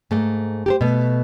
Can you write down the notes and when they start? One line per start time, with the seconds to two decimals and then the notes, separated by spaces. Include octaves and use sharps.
0.11 G#2 A3 A#3
0.66 G4 A4 C5
0.81 B2 A3